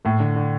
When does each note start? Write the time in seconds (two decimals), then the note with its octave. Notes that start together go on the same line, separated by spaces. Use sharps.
0.05 A2 A3
0.20 D3
0.36 D3